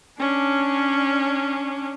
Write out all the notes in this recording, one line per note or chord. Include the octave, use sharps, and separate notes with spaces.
C#4 D4